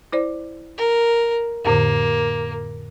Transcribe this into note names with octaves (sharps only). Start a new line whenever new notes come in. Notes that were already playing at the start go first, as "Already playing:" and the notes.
E4 C5 D5
A#4
F2 A2 D3 A#3